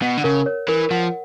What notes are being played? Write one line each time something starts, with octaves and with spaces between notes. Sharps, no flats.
B2 F#5
D3
C#3 A#4
C#5
E3 A#4
F3 F#5